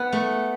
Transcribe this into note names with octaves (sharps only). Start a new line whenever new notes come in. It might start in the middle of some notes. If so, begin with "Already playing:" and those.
Already playing: B3
A3